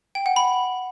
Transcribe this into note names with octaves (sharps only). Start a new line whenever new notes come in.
G5
F#5
B5